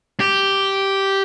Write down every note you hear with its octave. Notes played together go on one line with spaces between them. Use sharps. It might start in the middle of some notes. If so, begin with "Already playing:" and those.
G4